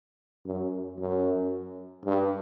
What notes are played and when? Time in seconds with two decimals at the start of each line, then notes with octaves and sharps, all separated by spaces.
0.46 F#2
0.99 F#2
2.06 G2